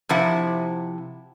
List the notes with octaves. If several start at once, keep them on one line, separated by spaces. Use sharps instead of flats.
C3 F3 E4 F#5